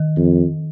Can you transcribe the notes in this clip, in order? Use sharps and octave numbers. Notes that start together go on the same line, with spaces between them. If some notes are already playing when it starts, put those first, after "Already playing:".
Already playing: D#3
F2